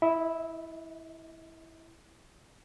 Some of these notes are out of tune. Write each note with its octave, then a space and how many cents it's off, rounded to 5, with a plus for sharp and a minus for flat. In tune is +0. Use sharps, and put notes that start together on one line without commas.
E4 -5 D#5 +40